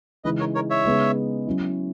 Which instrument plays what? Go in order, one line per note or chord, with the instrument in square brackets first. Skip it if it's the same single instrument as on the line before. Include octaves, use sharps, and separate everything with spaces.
[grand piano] C#3 E3 G#3 D#4 [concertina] B4 D#5
[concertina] A#4 C#5
A#4 C#5
C#5 E5
[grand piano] C#3 G#3 B3 D#4
F#3 C#4 E4